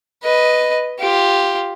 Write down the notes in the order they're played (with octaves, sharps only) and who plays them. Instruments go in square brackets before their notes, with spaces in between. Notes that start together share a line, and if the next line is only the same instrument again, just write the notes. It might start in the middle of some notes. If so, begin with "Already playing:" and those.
[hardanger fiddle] B4 D#5
F4 G4